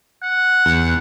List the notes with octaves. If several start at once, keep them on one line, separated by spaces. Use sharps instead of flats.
F#5
E2